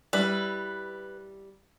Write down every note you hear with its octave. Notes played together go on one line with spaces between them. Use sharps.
G3 E4 B4